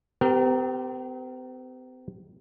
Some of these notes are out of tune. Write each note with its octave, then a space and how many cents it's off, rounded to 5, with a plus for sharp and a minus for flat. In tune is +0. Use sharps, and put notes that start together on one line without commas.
C4 -45 G4 +0 A#4 +0